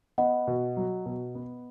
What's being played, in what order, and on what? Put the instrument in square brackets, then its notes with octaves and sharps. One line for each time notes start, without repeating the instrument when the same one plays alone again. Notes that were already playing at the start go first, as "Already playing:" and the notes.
[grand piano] B3 [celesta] D#5 F#5
[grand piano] B2
F#3
B2
B3